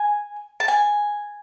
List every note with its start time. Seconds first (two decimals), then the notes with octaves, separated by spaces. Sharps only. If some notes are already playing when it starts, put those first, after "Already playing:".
Already playing: G#5
0.60 A5
0.68 G#5